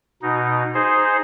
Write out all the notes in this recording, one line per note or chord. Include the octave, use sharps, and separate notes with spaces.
B2 D#4
D#4 G#4 C5